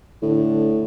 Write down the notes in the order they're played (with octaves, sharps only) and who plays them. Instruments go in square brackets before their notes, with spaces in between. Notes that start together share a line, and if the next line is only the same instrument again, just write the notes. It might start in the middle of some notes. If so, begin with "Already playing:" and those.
[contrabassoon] A2 [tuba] D3